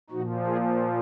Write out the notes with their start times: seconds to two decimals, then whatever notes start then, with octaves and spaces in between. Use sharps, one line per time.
0.10 A#2 F3 D#4 F#4
0.46 F4 G#4